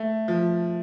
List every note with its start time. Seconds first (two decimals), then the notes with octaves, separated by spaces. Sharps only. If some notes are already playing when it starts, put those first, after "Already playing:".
Already playing: A3
0.28 F3